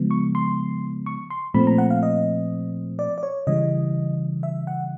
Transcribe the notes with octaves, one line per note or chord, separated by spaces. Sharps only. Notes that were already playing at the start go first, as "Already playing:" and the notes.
Already playing: C#3 F3 G#3 B3
C#6
C6
C#6
C6
A#2 F3 A3 C4 B5
A#5
F#5
F5
D#5
D5
D5
C#5
C#3 E3 G3 D#5
E5
F#5